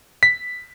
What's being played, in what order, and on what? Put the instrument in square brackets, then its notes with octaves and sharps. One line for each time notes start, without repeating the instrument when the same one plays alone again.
[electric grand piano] B6